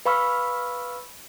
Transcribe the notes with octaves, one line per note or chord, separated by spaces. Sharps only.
B4 F5 B5 C#6 E6 F6